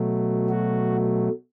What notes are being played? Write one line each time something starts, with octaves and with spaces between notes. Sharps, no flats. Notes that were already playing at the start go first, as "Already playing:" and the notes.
Already playing: B2 F#3 A3
F#4